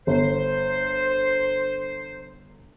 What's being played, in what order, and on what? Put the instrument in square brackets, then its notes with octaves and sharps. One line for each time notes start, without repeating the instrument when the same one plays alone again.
[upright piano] G1 [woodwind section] C5